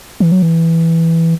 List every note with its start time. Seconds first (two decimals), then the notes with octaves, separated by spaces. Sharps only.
0.20 E3
0.32 F#3
0.42 E3